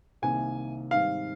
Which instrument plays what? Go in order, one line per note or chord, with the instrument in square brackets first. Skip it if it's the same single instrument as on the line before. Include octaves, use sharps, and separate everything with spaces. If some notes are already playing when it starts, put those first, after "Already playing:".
[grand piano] C2 C3 D#3 A#3 [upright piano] G#5
[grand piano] G#2 D#3 G3 C4 [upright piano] F5